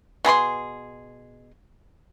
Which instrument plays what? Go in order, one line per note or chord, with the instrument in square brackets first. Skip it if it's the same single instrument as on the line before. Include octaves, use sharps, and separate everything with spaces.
[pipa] B2 G#4 B5 C6